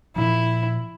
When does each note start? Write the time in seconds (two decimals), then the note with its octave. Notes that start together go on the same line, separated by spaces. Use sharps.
0.16 A#2 F3 E4